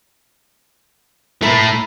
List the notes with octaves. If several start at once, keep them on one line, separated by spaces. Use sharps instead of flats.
A3 E4 A#5 B5